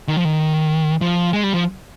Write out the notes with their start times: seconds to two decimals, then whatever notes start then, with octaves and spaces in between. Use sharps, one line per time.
0.08 D#3
0.16 F3
0.25 D#3
1.01 F3
1.33 G#3
1.44 G3
1.54 F3